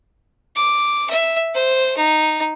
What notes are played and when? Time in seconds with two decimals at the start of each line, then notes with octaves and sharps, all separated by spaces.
0.56 D6
1.10 E5
1.55 C5
1.97 D#4